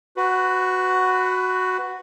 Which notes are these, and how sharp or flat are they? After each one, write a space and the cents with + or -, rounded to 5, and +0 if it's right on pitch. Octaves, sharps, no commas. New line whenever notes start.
F#4 +0 B4 +15